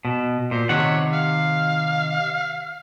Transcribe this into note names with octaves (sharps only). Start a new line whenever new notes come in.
B2
A#2 C5
C3 D#3 C#5 F#5
F5